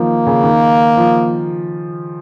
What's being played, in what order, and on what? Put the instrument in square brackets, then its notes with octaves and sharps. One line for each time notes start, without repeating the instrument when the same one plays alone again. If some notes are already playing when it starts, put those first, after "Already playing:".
Already playing: [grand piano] D#3 F3 [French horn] A#3
[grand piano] C#3
D#3
F3